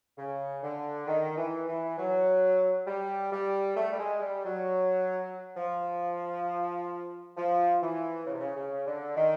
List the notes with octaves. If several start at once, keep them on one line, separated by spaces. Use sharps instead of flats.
C#3
D3
D#3
E3
E3
F#3
G3
G3
A3
G3
G#3
G3
F#3
F3
F3
E3
C#3
C3
C#3
C#3
D3
D#3